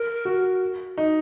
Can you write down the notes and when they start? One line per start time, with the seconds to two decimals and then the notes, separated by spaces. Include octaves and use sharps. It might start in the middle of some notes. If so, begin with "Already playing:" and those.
Already playing: A#4
0.25 F#4
0.98 D#4